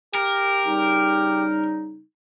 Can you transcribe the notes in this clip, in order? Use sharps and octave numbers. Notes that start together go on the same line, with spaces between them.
G4 A#4
C#3 G3 D#4